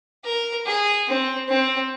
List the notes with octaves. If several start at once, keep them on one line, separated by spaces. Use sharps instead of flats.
A#4
G#4
C4
C4